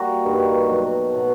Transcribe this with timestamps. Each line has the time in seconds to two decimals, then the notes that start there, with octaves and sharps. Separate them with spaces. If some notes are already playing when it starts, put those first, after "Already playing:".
Already playing: G3 A#3 F#4
0.25 G2 D#3 G3 A#3
0.68 B2 F#3 A3
1.11 B2 F#3 A3